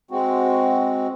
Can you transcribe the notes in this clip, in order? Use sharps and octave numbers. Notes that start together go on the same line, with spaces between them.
G#3 C4 F#4